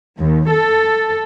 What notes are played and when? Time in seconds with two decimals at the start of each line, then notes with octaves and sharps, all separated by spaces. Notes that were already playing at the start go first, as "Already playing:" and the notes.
0.19 D#2
0.50 A4